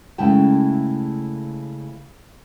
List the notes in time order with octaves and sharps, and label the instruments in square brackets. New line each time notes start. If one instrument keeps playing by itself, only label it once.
[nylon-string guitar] C#3 G#3 A3 E4 G5 A5